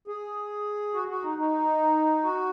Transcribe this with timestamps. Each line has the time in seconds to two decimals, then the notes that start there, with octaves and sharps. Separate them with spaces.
0.08 G#4
0.94 F#4
1.08 F#4
1.23 D#4
1.38 D#4
2.23 F#4